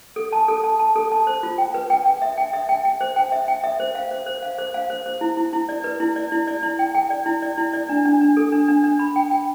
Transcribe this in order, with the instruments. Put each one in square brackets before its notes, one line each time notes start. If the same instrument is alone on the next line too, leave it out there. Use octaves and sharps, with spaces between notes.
[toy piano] A4
A5
A4
A5
A5
A4
A5
C5
F4
G5
B4
G5
G5
E5
G5
E5
G5
G5
C5
G5
E5
G5
E5
C5
F5
C5
C5
F5
C5
F5
C5
C5
E4
E4
E4
D5
B4
E4
D5
E4
D5
E4
G5
G5
D5
E4
D5
E4
D5
D4
D4
D4
A4
D4
D4
D4
B5
G5
G5